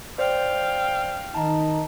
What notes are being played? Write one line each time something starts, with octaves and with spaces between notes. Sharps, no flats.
C5 D5 F5 G5
D#3 D#4 A5 A#5